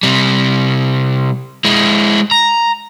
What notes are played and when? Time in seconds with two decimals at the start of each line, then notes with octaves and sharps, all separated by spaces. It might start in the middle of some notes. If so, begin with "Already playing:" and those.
0.03 C3 G3
1.65 G#3 E4
2.31 A#5